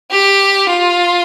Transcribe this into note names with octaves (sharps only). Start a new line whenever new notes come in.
G4
F4